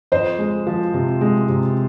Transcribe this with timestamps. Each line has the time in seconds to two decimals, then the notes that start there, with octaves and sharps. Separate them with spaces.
0.12 F2 C5 D#5
0.39 G#3
0.67 F3
0.94 C3
1.21 G#3
1.49 C3